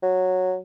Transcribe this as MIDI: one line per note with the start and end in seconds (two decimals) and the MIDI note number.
0.02 0.57 54